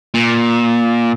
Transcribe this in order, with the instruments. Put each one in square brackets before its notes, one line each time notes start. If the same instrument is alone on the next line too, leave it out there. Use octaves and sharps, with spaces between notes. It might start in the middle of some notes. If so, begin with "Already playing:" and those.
[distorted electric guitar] A#2